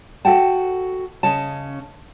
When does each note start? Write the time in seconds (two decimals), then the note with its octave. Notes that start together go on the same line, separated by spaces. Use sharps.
0.25 F#4 A4 F#5 G5 A5
1.23 C#3 C#4 D#5 A5